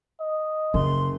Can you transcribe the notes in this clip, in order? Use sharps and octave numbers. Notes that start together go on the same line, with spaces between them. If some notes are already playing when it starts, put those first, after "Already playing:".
D#5
F#1 C#3 C6